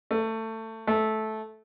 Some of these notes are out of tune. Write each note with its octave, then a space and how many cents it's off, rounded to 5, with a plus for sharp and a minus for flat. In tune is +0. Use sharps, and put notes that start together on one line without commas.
A3 +20
A3 -15